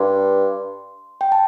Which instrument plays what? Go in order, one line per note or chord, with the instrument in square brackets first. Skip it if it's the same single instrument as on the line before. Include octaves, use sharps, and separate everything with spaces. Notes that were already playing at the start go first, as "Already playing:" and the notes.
Already playing: [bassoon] G2 [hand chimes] C6
[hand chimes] G5
A5